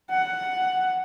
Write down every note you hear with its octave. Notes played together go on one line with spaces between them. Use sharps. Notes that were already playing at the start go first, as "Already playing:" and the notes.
F#5